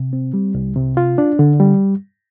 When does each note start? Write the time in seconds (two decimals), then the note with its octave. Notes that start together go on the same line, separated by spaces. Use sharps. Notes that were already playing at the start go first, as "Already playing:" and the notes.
Already playing: C3
0.13 C4
0.34 G3
0.55 C2
0.76 C3
0.97 F4
1.18 D4
1.39 D3
1.60 G3